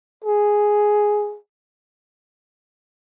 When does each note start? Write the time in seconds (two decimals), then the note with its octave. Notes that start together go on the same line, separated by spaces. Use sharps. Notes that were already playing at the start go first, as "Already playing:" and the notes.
0.24 G#4